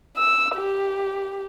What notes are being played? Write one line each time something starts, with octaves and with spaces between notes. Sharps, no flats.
E6
G4